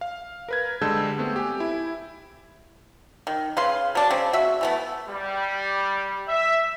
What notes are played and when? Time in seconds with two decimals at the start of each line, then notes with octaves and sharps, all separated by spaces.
0.01 F5
0.48 A#4 B4 G#6
0.82 D3 G3 G#3 A5 E6 G6
1.19 A3 B3 C4
1.36 G4 G#5
1.60 E4
3.27 D#3
3.57 C#3 B4 F5 C6
3.95 F#3 D4
4.10 C#3 C4
4.33 F#4 E5
4.61 E3 A3 B3
5.08 G3
6.28 E5